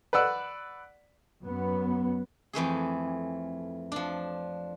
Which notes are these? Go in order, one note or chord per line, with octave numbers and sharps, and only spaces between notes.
B4 D5 F#5 E6
F#2 B3
F2 E3 A3 G#4
F3 D4